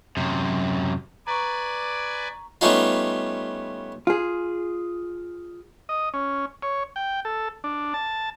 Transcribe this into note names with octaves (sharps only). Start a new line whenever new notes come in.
F#2 C3
B4 D5 G#5 A#5 C#6
G3 A3 B3 C#4 D#4 F4
F4 G#4
D#5
C#4
C#5
G5
A4
D4
A5